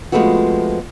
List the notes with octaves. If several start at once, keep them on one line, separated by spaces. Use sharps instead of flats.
F3 G#3 A3 B3 C4 F#4